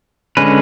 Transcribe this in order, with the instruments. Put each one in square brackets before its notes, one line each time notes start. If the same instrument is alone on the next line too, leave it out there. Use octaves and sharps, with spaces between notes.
[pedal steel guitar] D3 G#3 C#4 B4